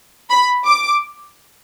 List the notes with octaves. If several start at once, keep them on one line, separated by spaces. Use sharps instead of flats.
B5
D6